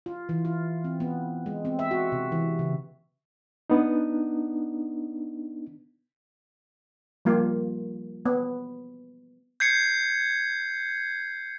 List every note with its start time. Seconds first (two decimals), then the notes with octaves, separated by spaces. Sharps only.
0.06 F4
0.29 E3
0.45 F4
0.84 C4
1.00 B3
1.46 G#3
1.65 C4
1.79 E5
1.91 F#4
2.12 C3
2.32 E3
2.59 C#3
3.70 B3 D4 D#4
7.25 F3 G3 A#3 F4
8.26 B3
9.60 G6 G#6 C7 C#7